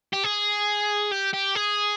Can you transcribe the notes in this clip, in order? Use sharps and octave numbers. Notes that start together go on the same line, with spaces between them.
G4
G#4
G4
G4
G#4